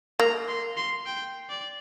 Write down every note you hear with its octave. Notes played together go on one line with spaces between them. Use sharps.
A#3 A#5
C6
C6
G5
D5